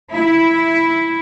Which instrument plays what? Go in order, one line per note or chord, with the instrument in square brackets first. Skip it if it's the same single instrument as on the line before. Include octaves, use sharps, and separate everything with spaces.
[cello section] E4